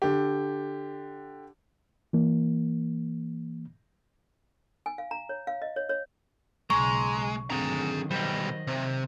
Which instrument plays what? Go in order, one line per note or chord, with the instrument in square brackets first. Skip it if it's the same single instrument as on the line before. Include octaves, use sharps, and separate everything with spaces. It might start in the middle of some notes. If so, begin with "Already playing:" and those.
[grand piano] D3 G4
[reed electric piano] E3 A#3
[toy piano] G#5
F5
A#5
C#5
F5
D#5
C#5
C#5
[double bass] B1 C#3 [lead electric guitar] G#3 [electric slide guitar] A#5 [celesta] C#6
[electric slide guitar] D3 C4 [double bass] D#3 F#3 [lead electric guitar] G#4 A#5
[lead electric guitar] B1 G3 [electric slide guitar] C5 D#5
[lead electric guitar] C3